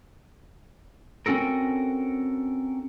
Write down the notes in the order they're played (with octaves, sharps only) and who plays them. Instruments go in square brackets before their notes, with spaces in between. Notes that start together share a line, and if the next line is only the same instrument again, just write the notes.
[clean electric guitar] C4 C#4 F#4 A4 A#4